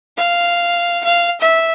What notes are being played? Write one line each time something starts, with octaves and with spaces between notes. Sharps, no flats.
F5
F5
E5